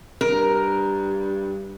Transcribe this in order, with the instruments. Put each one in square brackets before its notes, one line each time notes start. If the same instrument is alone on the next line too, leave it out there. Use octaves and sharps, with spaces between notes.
[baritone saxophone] G2 [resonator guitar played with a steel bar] A#4